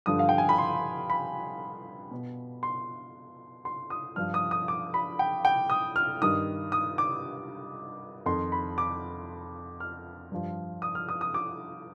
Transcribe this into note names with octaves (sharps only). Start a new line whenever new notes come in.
G2 D3 F3 D#6
F5
G5
G#5
B5
C6
B5
B2
C6
C6
D#6
G2 F3 F6
D#6
D#6
D6
B5
G5
G5
D#6
F6
G2 D#3 D#6
D#6
D6
F2 D#3 C6
B5
D6
F6
G2 F3
D#6
F6
D#6
D#6
D6